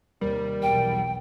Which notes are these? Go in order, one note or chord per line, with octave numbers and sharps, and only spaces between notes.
D#2 C3 G3 A#4
B1 E2 G5